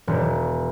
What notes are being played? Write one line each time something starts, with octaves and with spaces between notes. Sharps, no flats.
E1